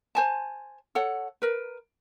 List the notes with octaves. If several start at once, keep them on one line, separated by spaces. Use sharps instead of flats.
C5 G#5 A5
A4 C#5 F#5
A#4 B4